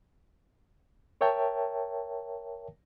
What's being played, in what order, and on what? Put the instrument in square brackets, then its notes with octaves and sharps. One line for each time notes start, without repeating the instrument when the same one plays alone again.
[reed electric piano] A#4 C#5 E5 G5 A5